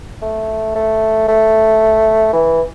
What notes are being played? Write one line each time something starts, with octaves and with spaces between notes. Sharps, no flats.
A3
A3
A3
E3